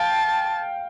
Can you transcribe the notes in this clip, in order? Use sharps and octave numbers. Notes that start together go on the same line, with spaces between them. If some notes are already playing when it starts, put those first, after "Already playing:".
Already playing: F5 G5 A5